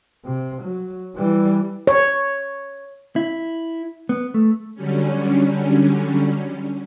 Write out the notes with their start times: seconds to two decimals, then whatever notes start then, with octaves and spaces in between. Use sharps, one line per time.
0.25 C3
0.62 F#3
1.16 E3 G3
1.87 C#5
3.16 E4
4.09 B3
4.34 A3
4.75 D3 F#3 G3 C#4